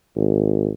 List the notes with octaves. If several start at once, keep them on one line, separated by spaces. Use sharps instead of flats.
G#1